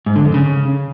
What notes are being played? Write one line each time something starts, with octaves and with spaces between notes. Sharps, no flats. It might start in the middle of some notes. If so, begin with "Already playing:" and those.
G#2
D3
F2
C#3